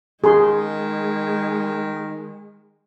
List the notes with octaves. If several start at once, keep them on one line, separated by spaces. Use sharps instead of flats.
D#3 G#3 G#4 C6